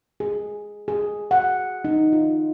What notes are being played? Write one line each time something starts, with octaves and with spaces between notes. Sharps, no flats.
G#4
G#4
F#5
D#4
F4